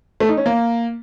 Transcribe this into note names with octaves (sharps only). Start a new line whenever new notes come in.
A3
D#4
C#4
A#3